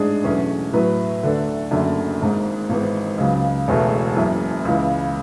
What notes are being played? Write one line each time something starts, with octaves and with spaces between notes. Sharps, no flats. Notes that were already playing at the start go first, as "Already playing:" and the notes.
Already playing: A1 G#2 G#3 D4 G#4
E2 B2 F#3 A3 C#4
A2 F#3 B3 E4 B4
D2 D3 A3 D4 A4
F#1 F#2 D3 A3
G#1 G#2 G#3
G#1 G#2 E3 G#3 B3
C#2 C#3 F#3
E1 E2 B2 A3
F#1 F#2 E3
C#2 C#3 E3